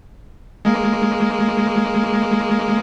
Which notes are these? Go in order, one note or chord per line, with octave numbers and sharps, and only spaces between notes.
G#3 A#3